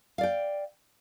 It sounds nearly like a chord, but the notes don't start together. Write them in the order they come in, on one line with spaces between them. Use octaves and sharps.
F5 D5 G5